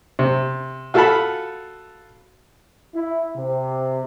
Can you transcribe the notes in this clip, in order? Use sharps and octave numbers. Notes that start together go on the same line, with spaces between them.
C3
F4 F#4 A4 F5 A5 B5
E4
C3